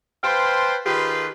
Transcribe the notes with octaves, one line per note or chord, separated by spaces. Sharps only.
B4 C5 F5 G5 A5 C6
D#3 F4 G4 G#4 B4